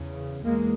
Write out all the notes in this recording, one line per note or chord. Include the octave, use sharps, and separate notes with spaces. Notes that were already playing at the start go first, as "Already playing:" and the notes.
Already playing: E2 C#3
E2 G#3 A#3